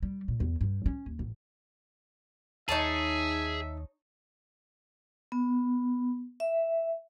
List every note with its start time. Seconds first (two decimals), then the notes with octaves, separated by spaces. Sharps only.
0.03 G3
0.28 A#2
0.40 E2
0.61 G2
0.86 C#4
1.06 D#2
1.19 A1
2.69 D#2 D#4 G#4 C#5 E5 A5
5.32 B3
6.40 E5